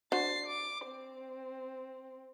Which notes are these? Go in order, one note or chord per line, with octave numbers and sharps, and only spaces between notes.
D4 F#4 C5 A6 C7
D6
C4